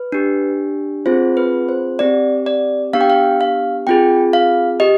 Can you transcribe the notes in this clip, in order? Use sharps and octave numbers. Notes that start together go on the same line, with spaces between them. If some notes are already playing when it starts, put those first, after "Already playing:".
Already playing: B4
D4 G4
C4 F4 G#4 C5
B4
C5
C4 G4 D5
D5
B3 D4 G4 F5
G5
F5
F5
C4 F4 G#4 G5
F5
G4 D#5